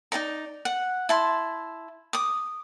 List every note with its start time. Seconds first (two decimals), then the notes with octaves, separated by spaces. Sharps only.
0.12 D#4 G#4 D5 A#5
0.65 F#5
1.09 E4 A5 C6
2.13 D6 D#6